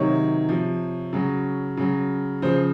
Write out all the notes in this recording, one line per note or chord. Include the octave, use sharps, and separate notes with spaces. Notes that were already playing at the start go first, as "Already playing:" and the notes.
Already playing: C3 D#3 F#3 C#5
C3 F3
C#3 F#3
C#3 F#3
C#3 F3 C5